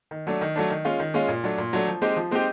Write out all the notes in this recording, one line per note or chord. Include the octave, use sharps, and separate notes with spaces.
D#3
F#3 A3 D4
D#3
F#3 A3 D4
D#3
G#3 C#4 F4
D#3
G#3 C#4 F4
A#2
F#3 A3 D4
A#2
F#3 A3 D4
F3
G#3 C4 D#4 G4
F3
G#3 C4 D#4 G4